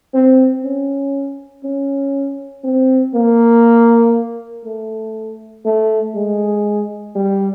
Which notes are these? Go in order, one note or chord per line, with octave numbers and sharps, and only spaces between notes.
C4
C#4
C#4
C4
A#3
A3
A3
G#3
G3